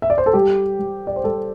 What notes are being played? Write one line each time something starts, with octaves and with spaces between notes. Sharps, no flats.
E5
D5
C5
A4
G3 G4
G3
D5
C5
G3 A4